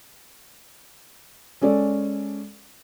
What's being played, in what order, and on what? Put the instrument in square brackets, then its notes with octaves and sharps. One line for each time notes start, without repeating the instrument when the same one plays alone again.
[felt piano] G#3 C#4 A4 D5